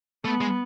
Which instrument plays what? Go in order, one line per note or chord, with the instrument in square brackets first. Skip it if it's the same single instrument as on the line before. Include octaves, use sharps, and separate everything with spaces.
[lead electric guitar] A3 [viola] B3
[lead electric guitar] G#3